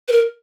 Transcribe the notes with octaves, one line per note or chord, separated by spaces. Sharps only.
B4
A#4